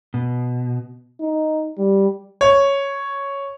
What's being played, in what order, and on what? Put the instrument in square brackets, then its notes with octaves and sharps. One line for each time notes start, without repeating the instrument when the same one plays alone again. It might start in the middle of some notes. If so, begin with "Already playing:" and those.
[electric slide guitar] B2
[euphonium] D#4
G3
[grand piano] C#5